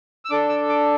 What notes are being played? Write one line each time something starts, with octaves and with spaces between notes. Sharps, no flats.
E6
D4 A4 D6
E6
D6